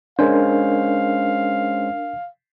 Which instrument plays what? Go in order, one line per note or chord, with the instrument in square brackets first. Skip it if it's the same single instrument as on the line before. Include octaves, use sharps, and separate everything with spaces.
[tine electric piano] G#3 C#4 C5 [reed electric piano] D4 A#4 [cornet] F5